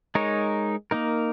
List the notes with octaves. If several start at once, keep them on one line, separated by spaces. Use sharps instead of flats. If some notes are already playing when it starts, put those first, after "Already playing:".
G#3 D#4 A#4 C#5
A#3 D#4 A#4